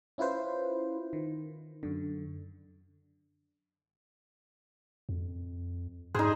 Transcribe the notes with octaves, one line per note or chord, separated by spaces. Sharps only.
C#4 E4 F4 B4 C5
D#3
F#2 D3
F2
G#2 D#4 G#4 C5